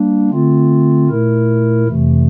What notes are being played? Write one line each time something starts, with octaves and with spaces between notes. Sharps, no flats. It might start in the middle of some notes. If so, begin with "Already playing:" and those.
Already playing: G3 A#3 D4
D3 A3 C4 F4
A#2 A3 E4 A#4
F2 C3 E3 A3